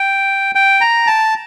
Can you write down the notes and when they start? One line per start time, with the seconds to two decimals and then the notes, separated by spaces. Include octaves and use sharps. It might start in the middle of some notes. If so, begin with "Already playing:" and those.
Already playing: G5
0.55 G5
0.81 A#5
1.07 A5